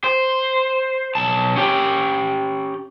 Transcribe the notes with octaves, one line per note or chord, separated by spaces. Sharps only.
C5
B1 A5
C#4 G4